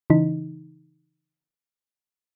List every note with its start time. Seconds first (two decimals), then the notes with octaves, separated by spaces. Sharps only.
0.10 C#3 E3 D#4